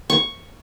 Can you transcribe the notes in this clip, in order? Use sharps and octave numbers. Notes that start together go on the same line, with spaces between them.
C#6